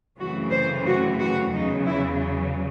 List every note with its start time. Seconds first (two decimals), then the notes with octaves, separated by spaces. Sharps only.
0.18 F#2 C#3 E3 A3 C4 F#4
0.52 C5
0.86 F#4
1.20 F#4
1.53 E2 C#3 F#3 D#4
1.86 E4